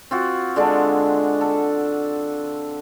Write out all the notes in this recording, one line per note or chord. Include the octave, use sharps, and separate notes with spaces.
C4 F4 F#4
D3 G#3 D4 A4
A4